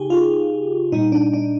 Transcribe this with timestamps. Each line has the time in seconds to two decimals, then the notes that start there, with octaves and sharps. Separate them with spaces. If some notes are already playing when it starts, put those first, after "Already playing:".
Already playing: C#3 D#4 G4 G#4
0.10 F4
0.92 A#2 G3 D#4
1.12 D4
1.33 D4